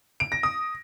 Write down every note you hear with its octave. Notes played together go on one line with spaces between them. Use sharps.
D7
A#6
D#6